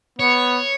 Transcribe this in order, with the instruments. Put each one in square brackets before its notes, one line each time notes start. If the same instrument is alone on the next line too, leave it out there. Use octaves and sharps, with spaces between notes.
[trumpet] B3 [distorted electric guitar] C#5